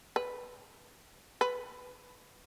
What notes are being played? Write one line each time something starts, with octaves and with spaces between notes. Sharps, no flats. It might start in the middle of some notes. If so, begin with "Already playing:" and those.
B4
B4